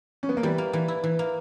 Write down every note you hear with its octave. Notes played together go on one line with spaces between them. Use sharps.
C#4
B3
A#3
E3 G3
A#3
E3
E4
E3
A#3